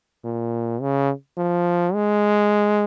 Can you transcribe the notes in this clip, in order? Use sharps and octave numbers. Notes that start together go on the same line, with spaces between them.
A#2
C#3
F3
G#3